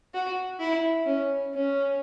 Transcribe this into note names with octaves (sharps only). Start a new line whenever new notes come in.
F#4
E4
C#4
C#4